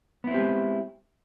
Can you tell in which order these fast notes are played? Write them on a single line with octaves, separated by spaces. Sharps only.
B3 E4 C4 G4 G#3